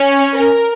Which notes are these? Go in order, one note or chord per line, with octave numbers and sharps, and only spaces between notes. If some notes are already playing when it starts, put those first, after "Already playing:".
Already playing: C#4 C#5
A#4